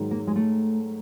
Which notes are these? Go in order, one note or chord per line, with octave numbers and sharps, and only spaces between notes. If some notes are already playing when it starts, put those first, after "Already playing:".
Already playing: G#2 D#3 F#3
A#3
G#3
A3